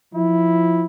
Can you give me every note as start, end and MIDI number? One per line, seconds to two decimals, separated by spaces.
0.14 0.85 53
0.14 0.85 64